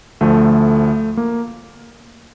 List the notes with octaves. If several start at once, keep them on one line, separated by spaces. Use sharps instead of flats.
D2 D3 F3 A3
A#3